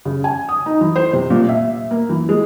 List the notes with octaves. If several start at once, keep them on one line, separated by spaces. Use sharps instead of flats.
C#3
G#5
D#6
D#4
E3
C5
C3
A#2
E5
A#3
E3
G#3